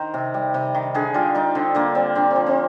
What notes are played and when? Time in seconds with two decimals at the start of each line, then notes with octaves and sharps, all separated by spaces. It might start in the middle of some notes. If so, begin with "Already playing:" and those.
Already playing: D#3 A#4 C5
0.14 C3
0.34 G3
0.54 C3
0.75 D#3
0.95 D3 G#4
1.14 G3 F4
1.35 G3 D#4
1.55 D3 C4
1.75 D3 A#3
1.95 G3 C4
2.15 D3 C4
2.31 C4
2.36 F3
2.46 C4